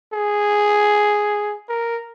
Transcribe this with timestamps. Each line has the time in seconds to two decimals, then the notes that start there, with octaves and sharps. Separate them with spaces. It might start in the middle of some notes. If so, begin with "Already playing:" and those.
0.13 G#4
1.69 A#4